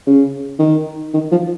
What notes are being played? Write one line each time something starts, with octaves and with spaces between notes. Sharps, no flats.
C#3
D#3
D#3
F3